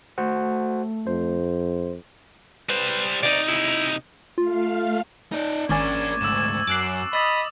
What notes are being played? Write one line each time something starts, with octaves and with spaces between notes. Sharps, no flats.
A3 F#4 C5 F#5
F2 C5
G3 B4 C5
C3 D#4 D5
E4
A3 F4 F5
D#4 D5
G#1 A#3 C#4 D4 C#6 D6 G#6 A6
D2 G#2 E6 E7
F#2 D6 F#6 C7
D#5 B5 D#6 A6 F#7